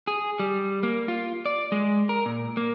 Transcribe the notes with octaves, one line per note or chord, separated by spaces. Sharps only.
G#4
G3
A#3
F4
D5
G#3
A#4
A#2
A#3